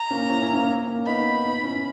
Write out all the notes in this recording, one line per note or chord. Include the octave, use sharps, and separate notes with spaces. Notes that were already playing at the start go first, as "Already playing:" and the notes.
Already playing: A#5
A#3 C#4
C#4 E4
C#4 E4
A#3 C#4
A#3 C#4
B3 D#4 B5
B3 D#4
C#4 E4